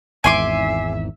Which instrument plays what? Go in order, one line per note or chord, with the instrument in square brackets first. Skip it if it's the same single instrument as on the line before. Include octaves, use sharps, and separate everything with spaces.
[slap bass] G#1 E2 G#2 [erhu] E5 [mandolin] G#5 C6 D6